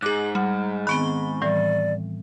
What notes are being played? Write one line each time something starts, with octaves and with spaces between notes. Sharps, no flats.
G#2 G#4 D6 F#6
G3 F#5
D#3 B3 C4 B5 C#6 G7
A2 E3 G3 D5